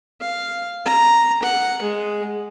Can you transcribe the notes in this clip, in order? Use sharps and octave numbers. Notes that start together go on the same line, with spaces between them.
F5
A#5
F#5
G#3